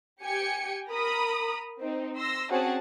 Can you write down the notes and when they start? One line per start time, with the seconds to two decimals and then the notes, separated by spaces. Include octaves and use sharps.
0.22 G4 G5 G#5 C#7
0.89 A#4 A#5 B5 D#6
1.80 C4 D#4
2.17 C6 E6 A#6
2.50 C4 C#4 F#4 G#4 F#5 A5